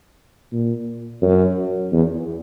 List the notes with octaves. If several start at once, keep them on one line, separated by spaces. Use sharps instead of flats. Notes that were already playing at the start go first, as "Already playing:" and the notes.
A#2
F#2
E2